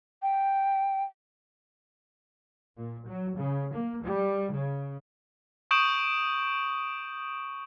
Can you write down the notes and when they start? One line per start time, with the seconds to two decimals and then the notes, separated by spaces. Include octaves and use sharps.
0.22 G5
2.77 A#2
3.08 F#3
3.37 C#3
3.73 A#3
4.03 G3
4.53 C#3
5.71 C#6 D#6 G6 D7 E7 F#7